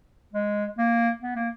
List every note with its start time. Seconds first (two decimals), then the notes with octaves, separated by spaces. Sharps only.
0.34 G#3
0.78 A#3
1.22 B3
1.36 A#3